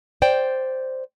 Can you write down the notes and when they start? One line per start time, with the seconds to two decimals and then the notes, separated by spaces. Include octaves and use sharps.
0.22 C5 D5 G5